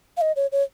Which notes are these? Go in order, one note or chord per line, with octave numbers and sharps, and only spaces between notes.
F5
D#5
C#5
C#5